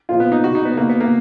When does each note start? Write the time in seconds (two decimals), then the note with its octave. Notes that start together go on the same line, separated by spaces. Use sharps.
0.09 A#2 F3 F4
0.20 B3
0.32 D#4
0.43 B2 F#4
0.55 D#4
0.65 B3
0.77 B2 A#3
0.89 B3
1.00 A#3